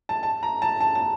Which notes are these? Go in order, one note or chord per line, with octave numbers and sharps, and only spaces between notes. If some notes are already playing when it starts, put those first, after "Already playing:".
A5
A5
A#5
A5
A5
A5